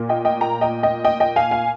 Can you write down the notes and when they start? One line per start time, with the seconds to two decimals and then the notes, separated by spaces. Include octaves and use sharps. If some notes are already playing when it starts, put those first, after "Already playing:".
Already playing: A#2 A#3
0.09 D#5 G5
0.25 D#5 G5
0.41 G5 A#5
0.61 D#5 G5
0.83 D#5 G5
1.04 D#5 G5
1.20 D#5 G5
1.36 F5 G#5
1.51 F5 G#5